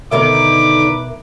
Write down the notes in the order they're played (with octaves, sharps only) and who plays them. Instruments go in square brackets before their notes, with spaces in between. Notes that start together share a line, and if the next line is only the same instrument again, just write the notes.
[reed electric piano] B2 A#4 E5 [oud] D3 D#3 D#4 [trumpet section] B4 D6